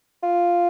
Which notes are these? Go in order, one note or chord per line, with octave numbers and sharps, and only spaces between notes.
F4